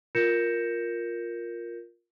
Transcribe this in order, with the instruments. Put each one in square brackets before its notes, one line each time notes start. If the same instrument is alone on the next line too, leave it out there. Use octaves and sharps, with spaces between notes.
[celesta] F4 A#4 G6 A#6 C#7 E7